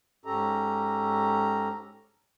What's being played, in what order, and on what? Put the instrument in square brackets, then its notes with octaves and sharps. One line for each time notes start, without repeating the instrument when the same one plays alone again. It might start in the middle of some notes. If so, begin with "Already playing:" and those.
[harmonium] G#2 C#4 G4 A4 A#5